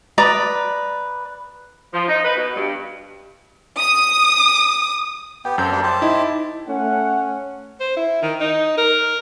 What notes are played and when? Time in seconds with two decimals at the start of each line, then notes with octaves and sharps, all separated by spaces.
0.18 B4 D5 A#5 D#6
1.94 F3
2.08 D#4
2.25 B4
2.36 B2
2.56 G2
3.79 D#6
5.45 B3 G4 G5
5.58 F#2 C4 A4 G6
5.72 G3 A#3 D4
5.83 G4 C5 A5
6.02 D#4 E4
6.68 A3 C#4 F#5
7.80 C5
7.96 E4
8.22 D#3
8.41 D#4
8.78 A#4